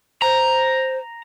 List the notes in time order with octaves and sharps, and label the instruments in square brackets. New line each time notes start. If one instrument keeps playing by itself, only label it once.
[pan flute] C5 [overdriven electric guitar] A#5